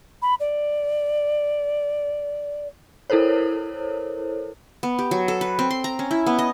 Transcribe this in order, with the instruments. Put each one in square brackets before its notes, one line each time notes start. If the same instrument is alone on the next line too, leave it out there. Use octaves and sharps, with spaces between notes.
[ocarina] B5
D5
[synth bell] E4 A4 A#4 C5 C#5
[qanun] B3
G4
F#3
A4
B4
C4
C6
A#5
C#4
E4
B3
D#5